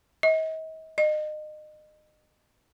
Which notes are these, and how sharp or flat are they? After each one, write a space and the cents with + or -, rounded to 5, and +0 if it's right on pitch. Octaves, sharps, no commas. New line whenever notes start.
D#5 +40
D#5 -30